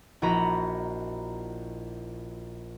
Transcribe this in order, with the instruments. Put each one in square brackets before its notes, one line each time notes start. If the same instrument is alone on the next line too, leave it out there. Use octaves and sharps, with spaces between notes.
[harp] A#1 E4 F#4 D#5 A#5 B5